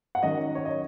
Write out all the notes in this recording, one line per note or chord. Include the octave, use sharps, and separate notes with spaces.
F#5
D#3 F#3 C#4 D#5
C#5
D#5